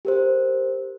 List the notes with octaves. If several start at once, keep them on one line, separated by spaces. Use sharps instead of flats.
G4 A#4 C5